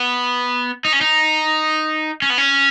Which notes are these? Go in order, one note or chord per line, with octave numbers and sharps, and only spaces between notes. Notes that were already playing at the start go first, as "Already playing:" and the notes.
Already playing: B3
D#4
C#4
D#4
C#4
B3
C#4